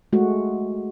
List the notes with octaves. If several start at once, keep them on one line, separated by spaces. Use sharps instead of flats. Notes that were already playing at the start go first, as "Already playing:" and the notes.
G#3 A3 F#4